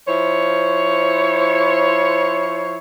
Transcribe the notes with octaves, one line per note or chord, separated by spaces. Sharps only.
F3 E4 C5 C#5